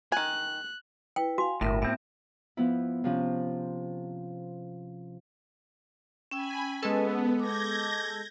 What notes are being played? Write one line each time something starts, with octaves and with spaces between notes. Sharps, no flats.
D#3 G#5 F#6
E4 B4 G5
F#4 F5 G#5
G1 A2 A#4 E5
A2 B3 C4 E5
F3 B3 E4
C3 F3 C#4
C#4 G5 G#5 B5 E6
G#3 B3 C#4 A4 B4 D#5
D6 G6 G#6 A#6